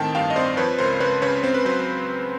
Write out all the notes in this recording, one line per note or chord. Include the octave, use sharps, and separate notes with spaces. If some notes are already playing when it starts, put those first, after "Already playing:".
Already playing: A2 D#3 C4 G5 A5
G2 F5 G5
D#5
C4 C5 D5
F3 B4 C#5
C#2 A#4 C5
C#2 B4 C#5
C#3 B4 C#5
C4 C5
B4
F#3 C5